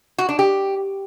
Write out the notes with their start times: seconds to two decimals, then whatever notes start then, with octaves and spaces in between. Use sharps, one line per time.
0.18 F#4
0.29 D4
0.39 G4